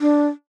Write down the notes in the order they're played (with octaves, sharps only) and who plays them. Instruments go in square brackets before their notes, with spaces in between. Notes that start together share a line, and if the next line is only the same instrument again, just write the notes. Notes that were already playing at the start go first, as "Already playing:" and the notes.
[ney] D4